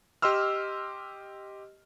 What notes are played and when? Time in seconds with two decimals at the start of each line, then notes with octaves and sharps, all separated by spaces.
0.22 G4 D#5 C6 E6 F6